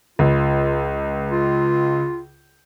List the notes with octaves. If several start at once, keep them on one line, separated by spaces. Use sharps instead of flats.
C#2 F4
F4